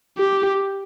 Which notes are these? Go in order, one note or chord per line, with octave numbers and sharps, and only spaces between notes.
G4